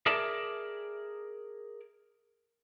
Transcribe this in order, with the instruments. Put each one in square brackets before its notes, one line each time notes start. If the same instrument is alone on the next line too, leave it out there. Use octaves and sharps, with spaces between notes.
[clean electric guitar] G#4 A#4 D5 E5 A5